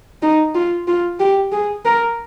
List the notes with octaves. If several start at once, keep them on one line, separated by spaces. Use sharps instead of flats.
D#4
F4
F4
G4
G#4
A#4